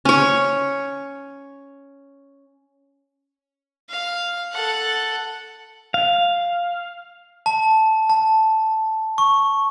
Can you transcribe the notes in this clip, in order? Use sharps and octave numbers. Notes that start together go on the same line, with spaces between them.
C#4 C#5
F5
A4 F#5
F5
A5
A5
C#6